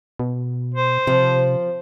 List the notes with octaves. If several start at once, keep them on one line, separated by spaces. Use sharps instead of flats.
B2
C5
C3 F3